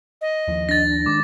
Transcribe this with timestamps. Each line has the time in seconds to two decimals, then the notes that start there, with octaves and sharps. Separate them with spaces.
0.21 D#5
0.48 D#2 F3
0.69 D4 A6 A#6
1.06 D#3 G#3 D6